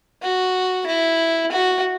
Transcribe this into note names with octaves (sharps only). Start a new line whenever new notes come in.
F#4
E4
F#4